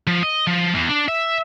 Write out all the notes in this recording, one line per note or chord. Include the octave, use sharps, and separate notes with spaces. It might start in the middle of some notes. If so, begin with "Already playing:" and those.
F3
D#5
F3
E2
D4
E5